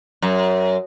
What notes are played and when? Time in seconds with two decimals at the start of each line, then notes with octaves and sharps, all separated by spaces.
0.22 F#2